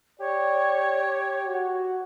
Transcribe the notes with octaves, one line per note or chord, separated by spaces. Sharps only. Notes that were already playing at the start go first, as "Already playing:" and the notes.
G4 C#5 D5
F#4